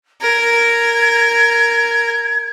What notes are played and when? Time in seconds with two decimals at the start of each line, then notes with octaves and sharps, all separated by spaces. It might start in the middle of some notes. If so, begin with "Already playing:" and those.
0.22 A#4 G#6